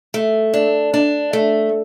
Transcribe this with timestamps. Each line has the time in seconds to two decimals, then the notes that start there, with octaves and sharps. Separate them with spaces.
0.14 A3
0.54 D4
0.94 D4
1.33 A3